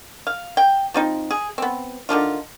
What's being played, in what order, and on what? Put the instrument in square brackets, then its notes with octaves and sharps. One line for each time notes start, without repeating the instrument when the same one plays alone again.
[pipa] F5
G5
F3 C4 D#4
G#4
B3 C4
D3 D#3 D4 F4